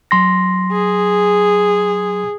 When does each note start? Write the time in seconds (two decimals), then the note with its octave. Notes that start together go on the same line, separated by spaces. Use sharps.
0.11 F#3 C6 A#6
0.71 G#4